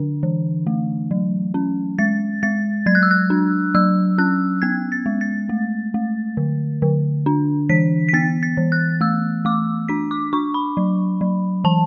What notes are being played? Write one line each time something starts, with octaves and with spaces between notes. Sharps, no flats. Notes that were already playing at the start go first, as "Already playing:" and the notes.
Already playing: D3 D4
E3
A3
F#3
C#4
G#3 A6
G#3 A6
F#3 G#6
F#6
E6
F#6
D4
F#3 E6
C#4 F#6
B3 G#6
A6
G#3
A6
A3
A3
D3
D3
D4
E3 B6
B6
B3 A6
A6
E3
F#6
A3 E6
A3 D6
D4 B6
D6
D4 C#6
B5
F#3
F#3
E3 A5